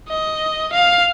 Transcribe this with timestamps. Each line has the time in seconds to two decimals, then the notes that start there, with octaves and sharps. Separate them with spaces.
0.09 D#5
0.73 F5